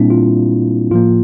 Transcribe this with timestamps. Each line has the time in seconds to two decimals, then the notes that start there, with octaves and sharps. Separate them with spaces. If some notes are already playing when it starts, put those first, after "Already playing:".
Already playing: A#2 G3 A#3 C4 D4 E4
0.10 F4
0.91 A2 F3 A#3 F4